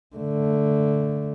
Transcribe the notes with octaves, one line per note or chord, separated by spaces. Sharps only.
D3 A3